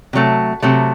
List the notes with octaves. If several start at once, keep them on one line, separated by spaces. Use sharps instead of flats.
C3 F#3 A3
C3 F#3 A3